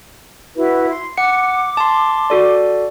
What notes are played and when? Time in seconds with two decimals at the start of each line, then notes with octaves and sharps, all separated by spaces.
0.55 E4 F#4 B4
0.90 C6
1.17 F#5 D6 C#7
1.77 A5 C6
2.30 F#4 A4 D5